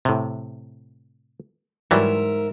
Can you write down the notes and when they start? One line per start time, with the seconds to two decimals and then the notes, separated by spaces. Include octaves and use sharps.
0.05 A2 C3
1.91 G#2 E3 F#3 G3 A#4 E5